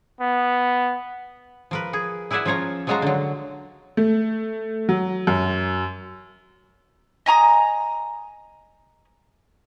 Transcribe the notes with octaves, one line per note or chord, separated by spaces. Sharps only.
B3
F3 A#4 B4
G#4
E4 G#4 B4 D5 E5 F#5
F3 C#4 F4 C#5 A#5
F3 F#3 G#3 F4 F#4 A#5
D3 F#3
A3
F#3
F#2
D#5 G#5 A#5 D#6